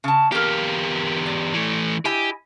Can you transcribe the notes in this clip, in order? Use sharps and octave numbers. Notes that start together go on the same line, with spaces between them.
C#3 A5
E2 A#3 G4 A#4
D5
E3 A3
E4 G4 D#5 G#5